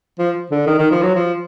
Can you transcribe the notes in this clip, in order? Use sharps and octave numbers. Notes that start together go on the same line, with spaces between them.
F3
D3
D#3
D#3
F3
F#3
F3